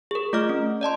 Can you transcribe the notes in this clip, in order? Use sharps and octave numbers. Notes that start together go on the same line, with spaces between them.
G#4 A#4
A3 F4 D#5 D6 F6
C#4
D5 D#5 A5 C6